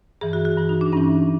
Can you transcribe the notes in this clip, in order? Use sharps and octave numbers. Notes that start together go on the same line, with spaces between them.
G2 E3 G#4
F#4
F#4
G2 E3
D#4
D4
G2 E3 C#4